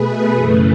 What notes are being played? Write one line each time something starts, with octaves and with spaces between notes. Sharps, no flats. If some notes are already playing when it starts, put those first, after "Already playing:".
Already playing: B2 A3 G#4 B4
F#2 C#3 E3 A3